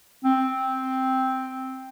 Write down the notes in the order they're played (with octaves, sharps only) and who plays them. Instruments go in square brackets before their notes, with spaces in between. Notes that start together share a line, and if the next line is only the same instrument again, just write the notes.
[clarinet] C4